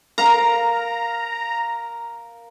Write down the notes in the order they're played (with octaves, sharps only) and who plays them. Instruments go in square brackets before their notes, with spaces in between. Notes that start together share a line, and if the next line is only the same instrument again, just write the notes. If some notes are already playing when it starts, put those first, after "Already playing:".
[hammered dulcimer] A#4 F5 [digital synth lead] A#5